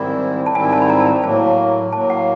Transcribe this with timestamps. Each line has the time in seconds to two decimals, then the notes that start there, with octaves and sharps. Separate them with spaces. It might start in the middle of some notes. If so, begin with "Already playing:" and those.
Already playing: G#2 D#3 G3 C4 E4 C#6
0.46 A5
0.54 G#2 D#3 G3 C4 E4 G#5
0.72 A5
0.82 B5
0.89 A#5
1.00 A5
1.07 A#5
1.24 A2 F#3 A#3 A5
1.92 A2 F#3 A#3 A5
2.10 F#5